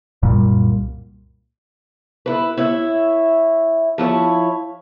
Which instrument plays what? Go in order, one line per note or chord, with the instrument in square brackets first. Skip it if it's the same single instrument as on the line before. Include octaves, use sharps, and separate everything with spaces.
[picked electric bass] C2 F#2 A#2 G3
[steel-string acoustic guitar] E4 B4
E4 C#5 E5
F3 E4 C#5